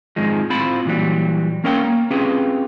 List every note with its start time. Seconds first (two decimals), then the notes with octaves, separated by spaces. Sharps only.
0.16 F2 G#2 D#3 F3 G#3
0.50 A2 C4 F4 C5 B5
0.85 A#2 E3 F#3 G3
1.64 A#3 C#4 A#4 C#5 F5 G5
1.84 A#3
2.11 C4 C#4 F4 G4 G#4 B4